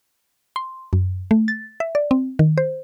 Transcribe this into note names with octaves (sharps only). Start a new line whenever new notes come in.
C6
F#2
A3
A6
E5
D5
C4
D#3
C5